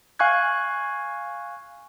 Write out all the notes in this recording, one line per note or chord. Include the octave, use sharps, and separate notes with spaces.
F5 G#5 C#6 F#6 G#6